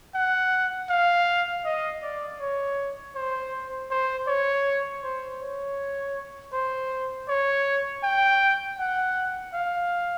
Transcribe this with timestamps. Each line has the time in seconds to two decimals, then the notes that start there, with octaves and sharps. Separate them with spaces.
0.15 F#5
0.90 F5
1.65 D#5
2.03 D5
2.40 C#5
3.15 C5
3.91 C5
4.28 C#5
5.03 C5
5.41 C#5
6.53 C5
7.28 C#5
8.04 G5
8.78 F#5
9.54 F5